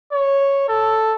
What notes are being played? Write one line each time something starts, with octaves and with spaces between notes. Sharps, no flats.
C#5
A4